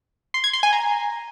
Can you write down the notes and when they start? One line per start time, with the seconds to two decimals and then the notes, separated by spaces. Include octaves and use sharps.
0.34 C6
0.44 G#6
0.53 C6
0.63 G#5
0.73 A#5